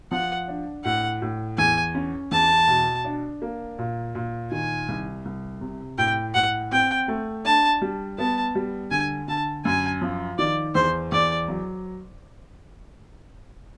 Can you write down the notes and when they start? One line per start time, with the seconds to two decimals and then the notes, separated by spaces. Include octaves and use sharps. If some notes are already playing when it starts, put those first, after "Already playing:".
0.11 F3 F#5
0.48 D4
0.84 A2 F#5
1.22 A2
1.58 E2 G#5
1.95 C#4
2.32 E2 A5
2.68 B2
3.05 D4
3.42 A#3
3.79 A#2
4.15 A#2
4.51 D#3 G#5
4.88 C2
5.25 C2
5.61 C3
5.98 A2 G5
6.34 A2 F#5
6.71 C4 G5
7.08 A3
7.45 D4 A5
7.82 G3
8.19 B3 A5
8.55 G3
8.91 D3 G#5
9.28 D3 A5
9.65 F#2 G#5
10.02 F3
10.38 D#3 D5
10.75 E2 C5
11.12 E2 D5
11.48 F#3